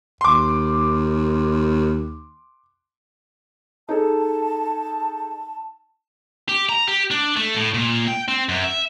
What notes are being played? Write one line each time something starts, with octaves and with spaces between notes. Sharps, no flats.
D#2 C6 D6
D#4 G#4 A4 A5
G4
A#5
G4
D4
A3
A2
A#2
G5
C4
F#2
E5